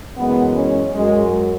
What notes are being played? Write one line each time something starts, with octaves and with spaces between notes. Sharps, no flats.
F#2 E3 G#3 B3
G#3 C#4
F#2 F#3 G#3